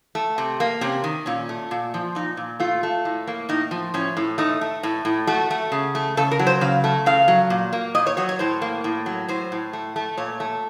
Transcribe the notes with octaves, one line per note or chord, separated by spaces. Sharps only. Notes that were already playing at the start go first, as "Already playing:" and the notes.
A3
C3
A#3
C3 C#4
D#3
A#2 C#4
A3
A#2
F3
A#2 D#4
A#2
A3 F4
A3
A2
A#3
A2 D#4
F3
A2 C#4
A2
A3 D#4
A3
A2
A2
A3 F#4
A3
C#3
A3
C#3 A4
A#4
F#3
C5
C#3 F5
A3
C#3 F5
F#3
A#2
A#3
A#2 D#5
C#5
F#3 C#5
C#5
A2 C5
A#3
A2
F#3
A2 C5
A2
A3
A3
A#2 C#5
A3